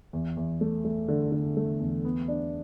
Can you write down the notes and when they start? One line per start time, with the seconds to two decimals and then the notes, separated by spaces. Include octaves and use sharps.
0.13 E2
0.37 E2
0.61 A3
0.85 A3
1.08 D3
1.32 D3
1.57 A3
1.80 E2
2.05 B3
2.28 D4